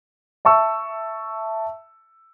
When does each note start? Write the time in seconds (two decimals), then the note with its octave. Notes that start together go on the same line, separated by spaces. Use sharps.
0.45 E5 A5 C#6 E6